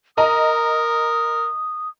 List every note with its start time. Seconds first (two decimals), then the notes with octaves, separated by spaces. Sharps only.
0.18 A#4 D#5 A#5 D#6